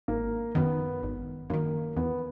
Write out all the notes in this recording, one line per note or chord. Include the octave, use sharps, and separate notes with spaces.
G#1 A#3
F#2 D#3 B3
G#1
F#2 D#3 A#3
E2 B3